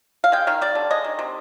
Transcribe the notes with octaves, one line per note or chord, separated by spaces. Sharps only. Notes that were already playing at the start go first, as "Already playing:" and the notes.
F5
G#3 G5
D#3 F5
G3 D5
D3
G#3 D#5
D#3
C3